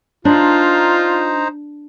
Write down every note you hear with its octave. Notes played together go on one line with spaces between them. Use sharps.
D4 D#4 F4 C5 A#5